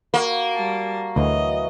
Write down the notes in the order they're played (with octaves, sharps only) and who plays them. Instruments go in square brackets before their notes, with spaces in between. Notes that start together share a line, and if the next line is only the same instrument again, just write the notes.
[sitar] A#3 [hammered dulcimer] F#4
[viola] G3 A5
[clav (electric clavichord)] D2 [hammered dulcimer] E3 F#3 F5 [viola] D#5